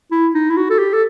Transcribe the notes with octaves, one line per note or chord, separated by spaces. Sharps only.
E4
D#4
E4
F#4
A4
G4
A4